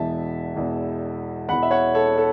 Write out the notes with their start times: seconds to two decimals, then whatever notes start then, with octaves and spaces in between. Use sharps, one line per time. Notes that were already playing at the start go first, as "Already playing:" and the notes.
Already playing: E1 E2 E3 E5 A5
0.55 E1 E2 E3
1.48 E1 E2 E3 F#5 B5
1.63 E5
1.71 C#5 F#5
1.94 A4 C#5
2.17 A4